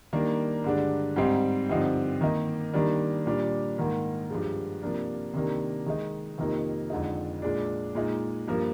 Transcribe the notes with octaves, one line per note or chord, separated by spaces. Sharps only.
D#3 G3 A#3 D4
G2 D3 G#3 D4
G#2 G3 C4 D#4
G2 D3 F3 C4 D#4
D#3 A#3 D#4
D#3 G3 A#3 D4
A#2 G3 D4
G#2 D#3 A#3
G2 F3 G#3
C3 F3 A#3 D4
C3 D#3 A#3 D4
D#3 G#3 D#4
F2 C3 D#3 A#3 D#4
F2 D3 G#3 D#4
A#2 G#3 D4
A#2 G#3 D#4
G2 F3 A#3